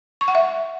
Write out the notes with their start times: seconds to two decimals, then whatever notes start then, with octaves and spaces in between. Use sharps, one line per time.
0.21 C#6
0.28 F#5
0.35 E5